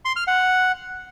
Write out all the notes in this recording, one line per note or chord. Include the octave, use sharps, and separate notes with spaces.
C6
F6
F#5